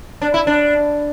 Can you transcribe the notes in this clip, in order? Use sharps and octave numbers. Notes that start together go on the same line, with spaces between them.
D4
E4
D4